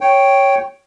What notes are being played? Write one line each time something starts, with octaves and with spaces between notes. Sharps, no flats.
C#5 G5